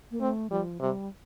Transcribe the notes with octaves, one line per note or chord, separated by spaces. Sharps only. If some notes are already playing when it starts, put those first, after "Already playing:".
A#3
A3 C4
F3 G3
C3 G3